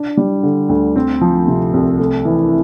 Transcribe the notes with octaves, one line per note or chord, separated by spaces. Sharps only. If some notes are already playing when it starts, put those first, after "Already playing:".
Already playing: D4
G3
D3
D2
C4
F3
C3
C2
A3
E3